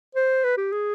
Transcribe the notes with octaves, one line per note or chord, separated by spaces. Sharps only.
C5
B4
G4
G#4